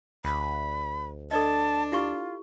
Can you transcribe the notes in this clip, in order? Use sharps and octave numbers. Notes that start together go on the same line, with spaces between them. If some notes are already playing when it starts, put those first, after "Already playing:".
D2 B5
D4 A4 D5 D#5 A5
E4 F4 G4 C#6